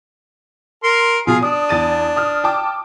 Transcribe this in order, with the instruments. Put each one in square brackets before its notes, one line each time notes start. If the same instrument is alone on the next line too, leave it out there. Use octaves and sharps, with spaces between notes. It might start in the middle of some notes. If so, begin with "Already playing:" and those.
[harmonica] A#4 C6
[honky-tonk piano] B2 F3 [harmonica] F4 G#4 F5
[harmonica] D4 [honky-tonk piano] D#6
[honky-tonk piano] E2 A6 D#7
D#6 F6
G5 A5 D6